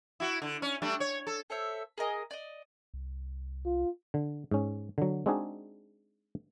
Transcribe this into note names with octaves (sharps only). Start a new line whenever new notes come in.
E4 F#4
D3
C#4
G3 A3 D4
C#5
A4
A4 C5 C#5 E5
G#4 A#4 D#5 G#5
D5 D#5
C2
F4
D3
G#2 C#4
D3 F#3
G#3 C4 D4 D#4 F#4 G#4